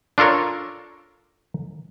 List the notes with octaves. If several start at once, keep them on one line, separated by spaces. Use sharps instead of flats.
D4 F4 A4 A#4 C#5